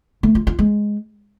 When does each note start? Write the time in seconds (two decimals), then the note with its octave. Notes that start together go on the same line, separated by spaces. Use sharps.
0.23 A3
0.35 F4
0.47 F4
0.59 G#3